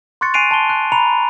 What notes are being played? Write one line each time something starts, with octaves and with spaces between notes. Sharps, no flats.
C6 C#6 F#6 A6 C#7
G#5 F#6 C7 D7 D#7 F7
A5 C6 G7
F#6
A#5 B5 C#7 F7